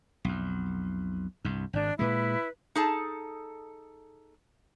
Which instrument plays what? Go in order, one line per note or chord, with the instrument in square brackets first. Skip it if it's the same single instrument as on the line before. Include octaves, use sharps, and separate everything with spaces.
[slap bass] B1 F2
C2 G2
[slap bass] G#1 G#2 [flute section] D4
[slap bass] A#2 G#3 [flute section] E4 B4
[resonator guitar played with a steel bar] D#4 G#4 A4 A5